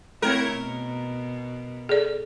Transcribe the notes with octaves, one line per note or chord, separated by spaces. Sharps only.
A3 C4 E4 A#4 C#5
B2
G#4 A4 D5